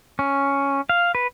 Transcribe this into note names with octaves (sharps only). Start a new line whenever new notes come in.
C#4
F5
B4